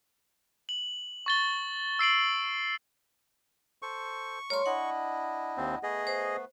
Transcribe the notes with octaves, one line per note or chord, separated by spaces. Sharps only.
F#7
C#6 A6 G7
E6 C7 D7 F#7
A4 C5 C#6
G3 A3 A#4 C#5 C6
D4 E4 D#5 F#5
D#2 C4
A3 B3 G#4 B4 D#5
C5